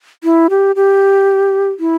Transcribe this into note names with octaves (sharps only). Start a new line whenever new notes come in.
E4
G4
G4
E4